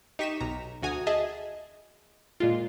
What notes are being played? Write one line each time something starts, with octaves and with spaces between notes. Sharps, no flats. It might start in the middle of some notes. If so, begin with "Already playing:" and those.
D#4 G4 C#6 B6 D#7 E7
B1 A#5
D2 F#4 G#5 A#5 D#6
G#4 D#5 E5 A5
A#2 G#3 F4